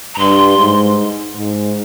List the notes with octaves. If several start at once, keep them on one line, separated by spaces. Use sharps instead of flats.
A#5
G2 C6
G#2
G#2